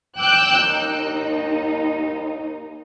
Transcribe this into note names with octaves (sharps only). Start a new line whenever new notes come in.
G5 D6 E6 F#6 G6
D#2 D#4